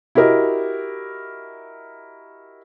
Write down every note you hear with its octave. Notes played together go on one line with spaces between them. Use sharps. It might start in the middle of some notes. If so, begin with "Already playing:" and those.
E4 F#4 G4 A#4 D#5